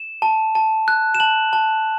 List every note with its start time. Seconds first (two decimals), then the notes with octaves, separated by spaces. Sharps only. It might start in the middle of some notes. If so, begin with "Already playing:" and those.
Already playing: E7
0.22 A5
0.55 A5
0.88 F#6
1.15 E7
1.20 A5 F#7
1.53 A5